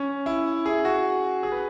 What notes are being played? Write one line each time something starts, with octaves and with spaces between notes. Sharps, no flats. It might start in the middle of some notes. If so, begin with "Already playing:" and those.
Already playing: C#4
E4
G#4
F#4
G#4
B4